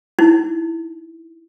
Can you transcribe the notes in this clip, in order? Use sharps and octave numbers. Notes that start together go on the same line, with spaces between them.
D#4 E4